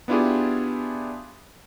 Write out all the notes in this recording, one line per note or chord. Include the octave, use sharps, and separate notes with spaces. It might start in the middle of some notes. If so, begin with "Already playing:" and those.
B3 D4 E4 F4 G4 G#4